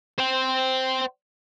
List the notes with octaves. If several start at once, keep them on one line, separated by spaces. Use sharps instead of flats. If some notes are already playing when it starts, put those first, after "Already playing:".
C5 G5